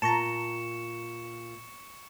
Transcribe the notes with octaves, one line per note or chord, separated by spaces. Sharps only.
A#2 A5 A#5 C#6 C#7 E7